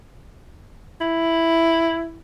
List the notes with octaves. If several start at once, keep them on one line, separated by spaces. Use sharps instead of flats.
E4